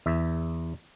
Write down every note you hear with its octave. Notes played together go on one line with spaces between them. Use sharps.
E2 E5